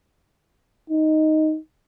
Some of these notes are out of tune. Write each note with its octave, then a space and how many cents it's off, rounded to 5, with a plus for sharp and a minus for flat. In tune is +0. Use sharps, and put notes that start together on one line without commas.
D#4 +5